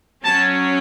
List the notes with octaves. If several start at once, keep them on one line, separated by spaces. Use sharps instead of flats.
F#3 C#4 A5